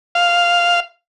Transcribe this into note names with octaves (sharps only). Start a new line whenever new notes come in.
F5